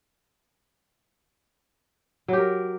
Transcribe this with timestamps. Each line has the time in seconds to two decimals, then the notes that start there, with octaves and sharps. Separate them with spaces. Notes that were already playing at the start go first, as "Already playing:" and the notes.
2.28 F#3
2.33 G4
2.38 A#4